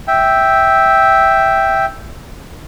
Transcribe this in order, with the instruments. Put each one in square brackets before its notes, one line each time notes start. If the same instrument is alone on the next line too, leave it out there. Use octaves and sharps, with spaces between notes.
[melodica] E5 G5